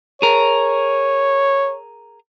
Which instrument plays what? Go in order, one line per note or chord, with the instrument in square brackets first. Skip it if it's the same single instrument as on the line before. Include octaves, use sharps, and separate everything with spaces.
[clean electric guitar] G#4 A#4 [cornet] C#5